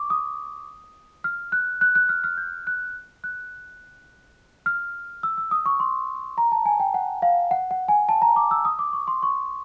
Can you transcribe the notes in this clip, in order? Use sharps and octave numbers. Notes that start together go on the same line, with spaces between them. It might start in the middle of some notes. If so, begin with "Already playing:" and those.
Already playing: C#6 D6
D#6
F6
F#6
F#6
F#6
F6
F6
G6
F#6
F#6
F6
E6
E6
D#6
C#6
C6
A#5
A5
G#5
G5
F#5
F5
F#5
F#5
G#5
A5
A#5
D6
E6
D#6
D6
C#6
C6
C#6